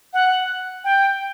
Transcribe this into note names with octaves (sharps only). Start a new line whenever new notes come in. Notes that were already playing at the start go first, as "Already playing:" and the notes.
F#5
G5